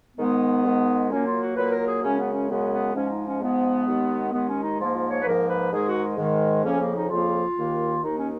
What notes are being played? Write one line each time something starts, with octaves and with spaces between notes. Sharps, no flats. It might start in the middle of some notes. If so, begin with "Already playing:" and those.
G#2 D#3 G#3 B3
G#2 D#3 G#3
A#2 F#3 A#3 C#4
F4
F#4
A#2 F#3 A#3 B4
A#4
G#4
F#2 C#3 G#3 C#4
B3
C#4
F#2 C#3 G#3 B3
B3
G#2 F3 G#3 C#4
D#4
C#4
G#2 F3 G#3 B3
D#2 D#3 G#3
D#2 D#3 G#3 B3
C#4
D#4
G#2 F3 A#3 F4
F4
C#5
B4
G#2 F3 A#3 A#4
B4
G#2 D#3 G#3 G#4
F#4
G#2 D#3 G#3
F2 C#3 F3 A#3 C#4
A#3
D#4
F2 C#3 F3 A#3 F4
D#2 D#3 A#3
D#2 D#3 A#3 D#4
C#4